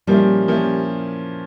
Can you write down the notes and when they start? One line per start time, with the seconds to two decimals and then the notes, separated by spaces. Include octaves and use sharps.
0.07 A#2 F3 G3 A#3 C#4 E4
0.48 A#2 F3 A#3 C#4 E4